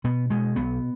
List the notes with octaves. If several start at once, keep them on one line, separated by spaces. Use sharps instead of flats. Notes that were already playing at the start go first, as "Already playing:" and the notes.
B2 B3
B2 G#3
B1 B3